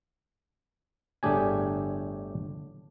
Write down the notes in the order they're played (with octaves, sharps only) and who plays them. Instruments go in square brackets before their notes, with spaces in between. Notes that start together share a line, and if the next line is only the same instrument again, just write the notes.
[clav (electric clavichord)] G1 A2 D4 G4 G#4 G#5